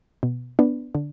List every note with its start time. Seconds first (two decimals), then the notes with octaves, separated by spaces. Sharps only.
0.23 B2
0.59 B3 D4
0.95 D3